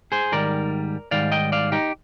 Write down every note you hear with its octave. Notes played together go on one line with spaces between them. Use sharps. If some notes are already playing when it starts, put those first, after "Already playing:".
G#4 C5
G#2 D#3 G3 A#4 D5
G#2 D#3 G3 D5 F5
D#5 G5
D5 F5
D#4 G4